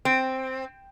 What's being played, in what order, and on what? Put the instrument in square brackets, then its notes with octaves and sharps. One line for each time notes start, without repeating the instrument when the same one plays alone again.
[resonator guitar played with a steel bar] C4